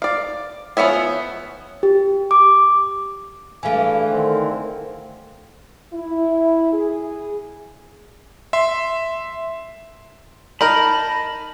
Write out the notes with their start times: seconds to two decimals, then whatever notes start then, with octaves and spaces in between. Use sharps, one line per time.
0.02 D5 F5
0.77 F3 B3 C#5 E5 G#5
1.83 G4
2.31 D6
3.63 G2 E3 A3 G#4 F5 G#5
4.10 D3 D#3 C4
5.93 E4
6.73 G#4
8.53 E5 C6
10.61 D#4 A#4 A5 B5 A#6